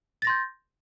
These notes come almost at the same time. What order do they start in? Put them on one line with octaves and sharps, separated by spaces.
A6 A#6 C6 G6